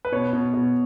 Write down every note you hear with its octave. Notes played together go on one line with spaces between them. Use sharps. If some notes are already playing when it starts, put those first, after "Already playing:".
B4
B2 C#5
B2
B2